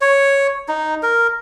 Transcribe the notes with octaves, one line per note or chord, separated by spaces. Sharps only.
C#5
D#4
A#4